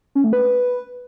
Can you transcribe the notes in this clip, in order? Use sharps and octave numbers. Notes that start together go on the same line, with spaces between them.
C#4
A3
B4